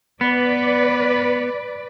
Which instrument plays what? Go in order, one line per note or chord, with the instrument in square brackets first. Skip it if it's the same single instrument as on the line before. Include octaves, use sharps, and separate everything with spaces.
[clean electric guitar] B3 [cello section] B4 D5